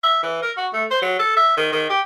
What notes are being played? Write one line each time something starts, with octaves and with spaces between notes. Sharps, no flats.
E5
E3
A#4
F#4
A3
C5
F#3
A4
E5
D#3
D#3
G4